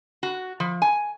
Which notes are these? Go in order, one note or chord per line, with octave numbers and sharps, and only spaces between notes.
F#4
F3
G#5